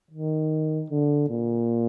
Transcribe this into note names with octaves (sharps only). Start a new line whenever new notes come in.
D#3
D3
A#2